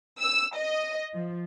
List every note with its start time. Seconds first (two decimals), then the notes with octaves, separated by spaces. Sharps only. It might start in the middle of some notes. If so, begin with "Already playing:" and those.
0.21 E6
0.56 D#5
1.14 F3